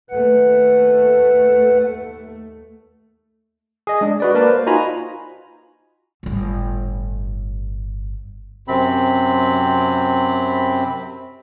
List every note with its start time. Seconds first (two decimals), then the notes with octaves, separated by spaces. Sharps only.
0.10 D#2 A3 B4 F#5
3.87 G#4 D#5
4.01 G#3 D4
4.20 F#4 B4 D5
4.34 A#3 A#4 B4 D5 F5 A5
4.49 C5
4.66 D#4 F4 F#4 G#5 A#5 B5
6.23 G1 A2
8.68 F#2 C3 C4 B5